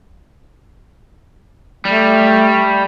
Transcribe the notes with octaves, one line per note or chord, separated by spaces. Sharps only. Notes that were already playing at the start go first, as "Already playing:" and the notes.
G3 A3